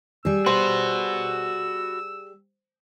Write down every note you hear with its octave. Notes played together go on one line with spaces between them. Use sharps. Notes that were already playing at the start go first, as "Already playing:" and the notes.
G3 G#4 E6
F#4 B4 C5